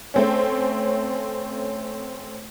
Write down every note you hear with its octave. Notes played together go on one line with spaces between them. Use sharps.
A3 C4 C#4